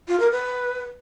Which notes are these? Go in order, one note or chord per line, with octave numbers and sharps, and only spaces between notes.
F4
A#4
B4